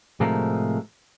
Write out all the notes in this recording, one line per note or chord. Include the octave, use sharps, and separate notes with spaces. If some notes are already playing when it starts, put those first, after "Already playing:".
A2 C3 F3 G#3 A3 A#4